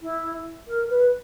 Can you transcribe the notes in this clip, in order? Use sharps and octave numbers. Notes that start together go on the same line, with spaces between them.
E4
A#4
B4